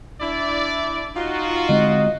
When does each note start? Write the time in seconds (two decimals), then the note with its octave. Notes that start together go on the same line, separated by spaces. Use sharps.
0.21 D4 E4 D5
1.16 D#4 F4 F#4
1.69 D3 G#3 C4 D#5